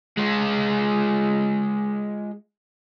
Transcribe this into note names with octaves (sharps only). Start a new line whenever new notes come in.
G#3 F4